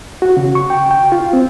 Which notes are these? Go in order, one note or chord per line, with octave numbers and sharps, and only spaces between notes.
F#4
C#3
C#6
G5
G5
F4
C4